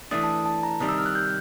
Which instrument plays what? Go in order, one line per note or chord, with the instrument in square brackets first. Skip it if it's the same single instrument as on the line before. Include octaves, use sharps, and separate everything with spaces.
[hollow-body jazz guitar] E3 A3 D4 [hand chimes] D#6
[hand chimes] A5
A5
A#5
[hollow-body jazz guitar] C3 D#3 G3 [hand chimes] D#6
[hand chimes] E6
F6
F#6
G6